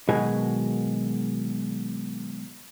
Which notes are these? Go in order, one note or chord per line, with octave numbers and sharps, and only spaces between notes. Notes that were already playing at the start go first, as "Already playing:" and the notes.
B2 D#3 F#3 G#3 G#4